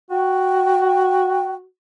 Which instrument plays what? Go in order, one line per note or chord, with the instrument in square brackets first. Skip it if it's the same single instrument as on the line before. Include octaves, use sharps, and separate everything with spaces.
[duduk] F#4 [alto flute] G5